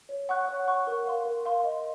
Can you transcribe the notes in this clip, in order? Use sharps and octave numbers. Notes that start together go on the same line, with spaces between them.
C#5
F#5 C#6 F#6
C#5
F#5 C#6 F#6
A#4
F5 C6
A#4
F5 C6
D#5